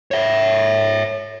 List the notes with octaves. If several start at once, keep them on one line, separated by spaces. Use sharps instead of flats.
C#5 E5